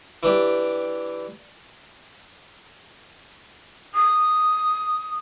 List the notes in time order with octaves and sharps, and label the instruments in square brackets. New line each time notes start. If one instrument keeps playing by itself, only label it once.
[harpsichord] E3 D4 G4
[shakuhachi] D#6